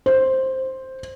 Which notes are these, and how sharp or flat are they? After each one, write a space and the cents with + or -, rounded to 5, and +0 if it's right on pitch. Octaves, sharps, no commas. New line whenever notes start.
C5 +5